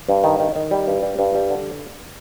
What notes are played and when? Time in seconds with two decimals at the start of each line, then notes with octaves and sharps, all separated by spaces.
0.09 G2
0.24 D#3
0.40 D#3
0.56 D#3
0.71 G3
0.88 G2
1.03 G3
1.19 G2
1.35 G3
1.50 D3